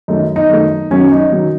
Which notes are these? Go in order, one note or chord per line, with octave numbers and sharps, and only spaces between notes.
F#2 D#3 A3 D#4
D#4
F#2 D#3 A3
F#2 D#3 F#3 C#4
D#4
D#3 F#3